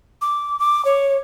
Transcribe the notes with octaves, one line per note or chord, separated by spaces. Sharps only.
D6
D6
C#5